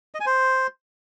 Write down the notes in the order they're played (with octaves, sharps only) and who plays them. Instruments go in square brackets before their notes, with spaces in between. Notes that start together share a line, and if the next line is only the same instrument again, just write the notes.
[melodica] D#5
G#5
C5